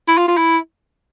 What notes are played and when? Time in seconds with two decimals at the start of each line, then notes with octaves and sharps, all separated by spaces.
0.08 E4
0.18 F4
0.28 F4
0.37 E4